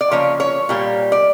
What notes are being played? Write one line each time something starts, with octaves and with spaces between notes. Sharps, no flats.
D5
C#3 F3 A#3 C#5
C#5
A#2 G3 A#3
D5